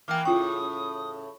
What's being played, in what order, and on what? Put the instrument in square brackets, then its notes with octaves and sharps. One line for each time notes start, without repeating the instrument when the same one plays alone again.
[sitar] E3 A#3 [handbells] G5 D6 [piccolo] F6
[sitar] A2 C#3 [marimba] E4 F4 G5 [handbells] C#6 [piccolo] D#6